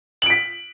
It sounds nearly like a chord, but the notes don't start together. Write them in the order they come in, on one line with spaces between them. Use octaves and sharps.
F#7 D7 B6